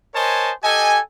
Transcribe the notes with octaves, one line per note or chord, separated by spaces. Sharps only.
A#4 C5 C#5 D#5 G#5 A5
G4 A4 D#5 G#5